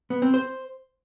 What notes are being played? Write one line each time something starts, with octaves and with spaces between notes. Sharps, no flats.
B3
C4
C5